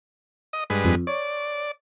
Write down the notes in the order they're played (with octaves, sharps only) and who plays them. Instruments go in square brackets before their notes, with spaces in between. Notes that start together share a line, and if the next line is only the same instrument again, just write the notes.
[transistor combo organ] D#5
G2 G#3 B4
[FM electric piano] F2
[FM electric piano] C#5 [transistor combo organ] D5